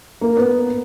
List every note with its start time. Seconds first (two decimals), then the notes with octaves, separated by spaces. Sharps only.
0.21 A#3
0.37 B3